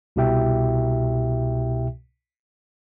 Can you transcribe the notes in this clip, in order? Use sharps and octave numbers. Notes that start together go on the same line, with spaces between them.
C2 B2 E4 G4 E5 G5